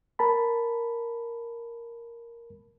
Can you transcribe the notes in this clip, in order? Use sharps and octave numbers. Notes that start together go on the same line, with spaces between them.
A#4 A5 B5